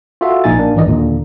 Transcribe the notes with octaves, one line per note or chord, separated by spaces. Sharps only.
F4 F#4 A4 E5
A#1 A#2 D#4 G#5 A6
A#3 D4
A1 G2 D#3 E3 D5 D#5
D#2 A#2 D3